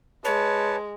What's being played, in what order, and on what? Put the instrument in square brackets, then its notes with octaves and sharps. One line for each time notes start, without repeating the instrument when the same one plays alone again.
[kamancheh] G#3 [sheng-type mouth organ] B4 A5 [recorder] C#5